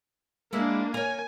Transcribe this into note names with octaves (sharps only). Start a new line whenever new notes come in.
G#3 A#3 D4 E4
A#4 C#5 G#5